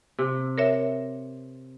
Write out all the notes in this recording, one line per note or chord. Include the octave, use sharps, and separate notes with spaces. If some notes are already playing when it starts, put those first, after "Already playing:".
C3
A#4 C#5 E5